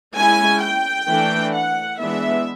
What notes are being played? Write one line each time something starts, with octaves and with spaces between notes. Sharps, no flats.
G#3 C#4 E4 G#5
G5
E3 A3 D4
F#5
E3 G#3 B3 D4 E5